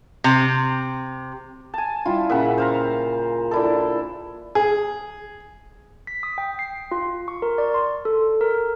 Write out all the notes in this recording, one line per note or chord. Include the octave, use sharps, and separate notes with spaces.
C3
G#5 A5
G3 E4 F4
A#2 C#3 E5 F#5 A#5
C5 F5 A#5
D4 E4 A4
G#4
B6
D#6
G5
C7
F4
C#6
A#4
D5
C6
A4
A#4